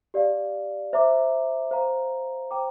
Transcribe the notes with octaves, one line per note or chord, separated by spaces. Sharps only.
G4 D5 F5
C5 E5 A#5 D6
C5 F5 A#5
C5 G5 A#5 D6